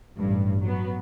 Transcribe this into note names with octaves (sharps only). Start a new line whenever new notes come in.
A1 G2
F#3 B3